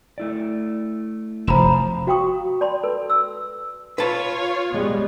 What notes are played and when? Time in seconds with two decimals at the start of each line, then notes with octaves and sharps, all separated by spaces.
0.18 A3 E4 D5
1.47 F1 F3 A#5 B5 E7
2.07 F#4 F5 G5 C#6 D#6
2.61 D5 A5 B5 C6
2.83 A4 B4 A5
3.10 E6
3.98 F4 B4 C#5 A5
4.73 G3 G#3 B3